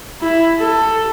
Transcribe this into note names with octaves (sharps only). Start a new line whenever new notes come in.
E4
A4